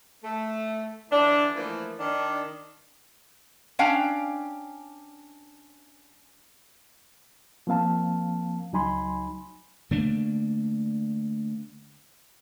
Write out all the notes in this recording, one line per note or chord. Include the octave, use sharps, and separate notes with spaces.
A3
D3 E3 D4
E3 F3 A3 A#3
D#3 D4
C#4 D4 F5 G5
F3 A#3 C4 F5 A5
C#2 F#3 D#4 G#5 B5 C6
D3 A3 A#3 D4